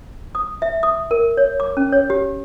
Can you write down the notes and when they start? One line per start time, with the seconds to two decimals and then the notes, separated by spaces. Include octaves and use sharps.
0.35 D#6
0.62 E5
0.83 D#6
1.11 A#4
1.37 C#5
1.60 D6
1.77 C#4
1.92 C#5
2.10 G4